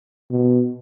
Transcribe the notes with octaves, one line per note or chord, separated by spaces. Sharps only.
B2